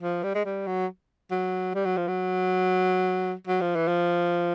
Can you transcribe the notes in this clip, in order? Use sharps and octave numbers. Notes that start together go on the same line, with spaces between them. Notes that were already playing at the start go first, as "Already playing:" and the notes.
F3
G3
G#3
G3
F#3
F#3
G3
F#3
F3
F#3
F#3
F3
E3
F3